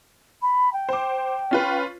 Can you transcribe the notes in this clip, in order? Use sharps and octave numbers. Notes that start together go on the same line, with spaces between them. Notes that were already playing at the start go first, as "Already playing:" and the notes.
B5
G5
C5 D6
C#4 F4 B4